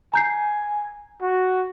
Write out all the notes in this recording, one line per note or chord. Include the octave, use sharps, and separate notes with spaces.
G#5 A#5 G6 C7
F#4